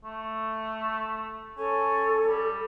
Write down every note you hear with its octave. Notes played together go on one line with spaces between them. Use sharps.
A3
C#4 A4
G3